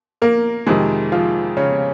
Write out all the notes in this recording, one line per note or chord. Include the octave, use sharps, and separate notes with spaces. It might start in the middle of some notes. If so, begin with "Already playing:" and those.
A#3 A#4
F2 C3 D#3 G#3 G#4
F3 F4
C#3 C#4